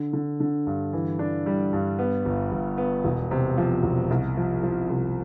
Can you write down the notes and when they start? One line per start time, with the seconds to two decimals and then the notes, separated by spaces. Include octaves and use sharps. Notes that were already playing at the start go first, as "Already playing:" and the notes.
Already playing: D3
0.13 D3
0.40 D3
0.67 G2
0.93 E3
1.19 D4
1.46 G3
1.73 G2
1.99 B3
2.25 G1
2.52 G1
2.78 B3
3.05 E1
3.31 C3
3.58 F3
3.83 E1
4.11 C2
4.37 F3
4.63 F3
4.90 C2